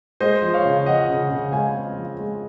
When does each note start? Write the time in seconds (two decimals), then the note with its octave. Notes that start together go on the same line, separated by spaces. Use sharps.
0.20 G#3 C5 D#5
0.42 F3
0.54 C#5 F5
0.65 C#3
0.86 F3 D#5 F#5
1.09 C#3
1.30 C#3
1.52 G#3 F5 G#5
1.75 C4
1.97 F3
2.19 G#3